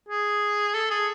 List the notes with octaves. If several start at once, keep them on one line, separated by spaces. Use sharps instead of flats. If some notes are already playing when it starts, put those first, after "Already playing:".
G#4
A4
G#4